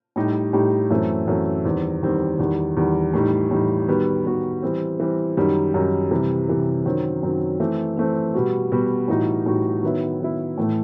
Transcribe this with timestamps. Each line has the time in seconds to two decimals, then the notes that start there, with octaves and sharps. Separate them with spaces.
0.16 A2 G3 D#4 G4
0.53 A2 G3 D#4 G4
0.91 F#2 E3 A3 C4
1.28 F#2 E3 A3 C4
1.65 E2 D#3 G3 C4
2.02 E2 D#3 G3 C4
2.39 E2 D#3 G3
2.77 E2 D#3 G3
3.14 A2 E3 G3 D#4
3.51 A2 E3 G3 D#4
3.88 D#3 G3 B3 F#4
4.25 D#3 G3 B3 F#4
4.63 E3 G3 C4
5.00 E3 G3 C4
5.37 F#2 D#3 G3 D#4
5.74 F#2 D#3 G3 D#4
6.11 C3 E3 G3
6.48 C3 E3 G3
6.85 F#2 D#3 F#3 C4
7.23 F#2 D#3 F#3 C4
7.60 E3 A3 C4
7.97 E3 A3 C4
8.34 B2 G3 B3 F#4
8.71 B2 G3 B3 F#4
9.08 A2 E3 G3 D#4 F#4
9.46 A2 E3 G3 D#4 F#4
9.83 D#3 F#3 B3 E4
10.20 D#3 F#3 B3 E4
10.58 A2 E3 A3